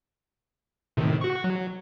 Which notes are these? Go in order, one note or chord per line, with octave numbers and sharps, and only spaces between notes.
A2 C3 D#3
F#4 C#6
F#3